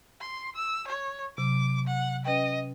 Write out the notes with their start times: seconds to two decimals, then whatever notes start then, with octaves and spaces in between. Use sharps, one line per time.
0.21 C6
0.56 E6
0.88 C#5
1.38 C3 F#3 D6
1.87 F#5
2.25 C#4 B4 D#5 G5